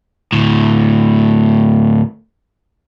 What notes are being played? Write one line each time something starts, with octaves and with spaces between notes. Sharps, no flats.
D2 A2